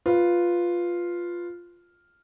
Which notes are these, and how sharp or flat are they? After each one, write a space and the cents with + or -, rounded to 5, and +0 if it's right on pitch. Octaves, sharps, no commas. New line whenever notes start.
F4 +0 B4 +0